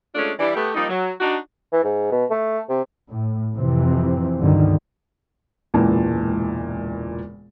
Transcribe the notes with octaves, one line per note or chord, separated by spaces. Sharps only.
G#3 A3 C#4 D4 F4 A4
E3 G3 D5
A3 B3 G4
F3 G3 A#3 D#4
F#3
D4 D#4 F#4
E3
G#2
B2
A3
C3
A2
F2 C3 E3 C4
C#2 G2 B2 D3 D#3
E1 C#2 A#2 E3 A5